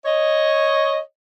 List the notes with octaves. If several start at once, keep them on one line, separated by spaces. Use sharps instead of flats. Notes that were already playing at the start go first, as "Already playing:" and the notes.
C#5 D#5